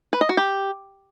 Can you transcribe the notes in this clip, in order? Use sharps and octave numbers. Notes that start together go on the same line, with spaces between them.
B4
D#5
F#4
G4